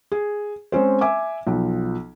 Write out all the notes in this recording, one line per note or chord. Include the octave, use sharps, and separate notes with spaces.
G#4
G#3 C4 C#4 C5
E5 G#5 D6
B1 F3